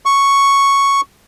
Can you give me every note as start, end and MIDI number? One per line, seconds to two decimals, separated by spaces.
0.06 1.01 85